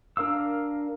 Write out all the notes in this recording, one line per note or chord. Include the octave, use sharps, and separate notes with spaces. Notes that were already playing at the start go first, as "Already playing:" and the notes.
D4 A#4 F5 E6